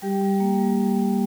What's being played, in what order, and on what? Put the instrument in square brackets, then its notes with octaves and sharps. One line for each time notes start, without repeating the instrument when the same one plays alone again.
[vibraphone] G3 G4 G5
G3
A#3
G3
G3
A#3